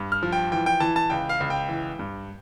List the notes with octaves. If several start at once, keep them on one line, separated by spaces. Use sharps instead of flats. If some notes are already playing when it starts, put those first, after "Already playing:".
Already playing: G2
F6
F3
G5
E3 G5
G5
E3 A5
A5
C#2 G5
F5
C#2
G5
E3
G2